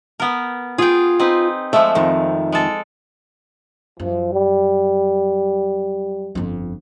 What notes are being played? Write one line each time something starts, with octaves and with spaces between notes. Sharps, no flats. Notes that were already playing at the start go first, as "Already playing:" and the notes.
B3 A#4
F4 G#4 G5
C4 D#4 B4
F3 G#3 A3 E5
F2 D#3
G#3 A4
F#2 F3
G3
G1 F2